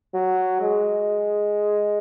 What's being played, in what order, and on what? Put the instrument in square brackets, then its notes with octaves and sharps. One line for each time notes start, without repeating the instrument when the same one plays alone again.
[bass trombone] F#3
G#3